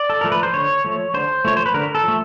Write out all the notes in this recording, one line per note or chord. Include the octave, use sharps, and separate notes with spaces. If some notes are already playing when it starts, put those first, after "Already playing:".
Already playing: D5
A4
F3 A3 A#4
B4
C5
D3 C#5
F3 A3
D3 C5
F3 A3 C#5
C5
B4
D3 A#4
A4
F3 A3